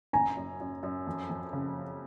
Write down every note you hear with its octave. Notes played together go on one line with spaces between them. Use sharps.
F#1 G#5 A#5
F#2
F#2
F#2
F2
F2
C#3